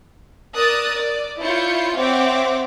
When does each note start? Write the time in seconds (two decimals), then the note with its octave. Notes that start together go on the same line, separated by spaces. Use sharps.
0.55 A#4 D5 D#6 E6 F#6 A6
0.95 D5
1.41 E4 F4 C#5 G6 C#7
1.98 C4 C#5 E5 F#5 G5 D6